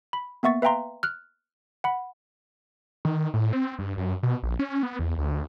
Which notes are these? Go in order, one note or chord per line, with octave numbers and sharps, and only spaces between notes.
B5
A#3 B3 E5 C#6 A6
B4 E5 F5 G5 A#5 C6
F6 F#6
F#5 B5
D#3
A2
C4
G2
F#2
B2
A#1
C#4
B3
E2
D2